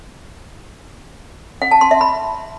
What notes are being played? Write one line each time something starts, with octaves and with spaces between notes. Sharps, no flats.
F#5
A5
C6
E5
B5